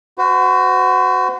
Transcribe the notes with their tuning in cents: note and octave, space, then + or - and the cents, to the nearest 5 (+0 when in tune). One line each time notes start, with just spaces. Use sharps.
F#4 +0 C5 -45